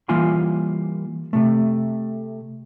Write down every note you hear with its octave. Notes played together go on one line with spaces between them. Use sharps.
E3 G3 A#3 F4 G#5 C6
C3 A3